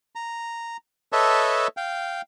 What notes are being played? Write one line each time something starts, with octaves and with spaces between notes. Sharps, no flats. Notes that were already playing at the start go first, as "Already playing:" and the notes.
A#5
A4 B4 C#5 D#5 E5 A5
F5 G5